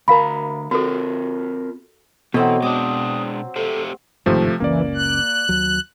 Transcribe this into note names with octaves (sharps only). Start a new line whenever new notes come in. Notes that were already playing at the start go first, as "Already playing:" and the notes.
D2 A#4 F5 A#5 B5
C4 F4 F#4 A4 A#4
B2 E3 F#3 C4 A4 D#5
G#3 D4 D6 D#6
A3 G4 A4 C5
G1 G#2 C3 D#3 F3 A3
F#1 C#2 E3 A#3 C#4 D5
F#6
D#2 F#3